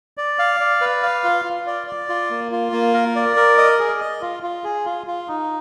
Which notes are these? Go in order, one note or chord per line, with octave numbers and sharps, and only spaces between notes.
D5
F5
D5
B4
F5
F4
F4
D5
D5
F4
A#3
F4
A#3
A#4
D5
A#4
D#5
G#4
D#5
F4
F4
G#4
F4
F4
D#4